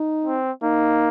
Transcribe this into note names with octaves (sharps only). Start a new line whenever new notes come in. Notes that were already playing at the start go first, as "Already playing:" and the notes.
Already playing: D#4
C4
A#3 D#4